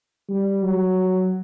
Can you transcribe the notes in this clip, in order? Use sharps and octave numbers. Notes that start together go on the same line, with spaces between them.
G3
F#3